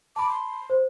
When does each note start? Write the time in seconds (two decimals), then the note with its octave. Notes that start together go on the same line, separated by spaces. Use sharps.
0.16 A5 B5 D6
0.29 C6
0.70 C5